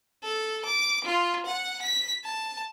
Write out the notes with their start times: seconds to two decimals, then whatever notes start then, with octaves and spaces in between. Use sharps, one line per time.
0.23 A4
0.66 D6
1.05 F4
1.46 F#5
1.82 B6
2.25 A5